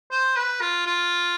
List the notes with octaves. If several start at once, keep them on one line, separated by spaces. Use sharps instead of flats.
C5
B4
F4
F4